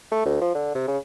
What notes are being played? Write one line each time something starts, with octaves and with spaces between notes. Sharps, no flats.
A3
D2
F3
D3
C3
C#3